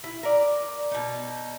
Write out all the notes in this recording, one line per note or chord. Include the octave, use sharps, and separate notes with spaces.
E4
A#4 D5
B2 D#4